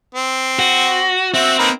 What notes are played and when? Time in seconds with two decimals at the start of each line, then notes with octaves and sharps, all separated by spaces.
0.15 C4
0.59 F#4
1.34 C4 F#4 E5
1.59 A#3 D#4 B4